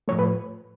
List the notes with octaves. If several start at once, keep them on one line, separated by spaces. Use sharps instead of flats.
A2 F3 A3 C#5
B4